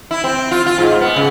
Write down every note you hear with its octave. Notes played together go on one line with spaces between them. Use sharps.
E4
C4
F4
F4
G#2
B3
C#3